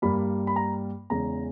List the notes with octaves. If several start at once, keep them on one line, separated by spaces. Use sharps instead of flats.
G2 G3 A#3 B5
B5
A#5
E2 C#3 E3 G#3 A#5